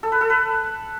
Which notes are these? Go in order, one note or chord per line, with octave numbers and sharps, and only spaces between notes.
A4
B4
A4
B4